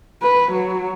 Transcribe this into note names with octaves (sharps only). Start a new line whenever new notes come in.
B4
F#3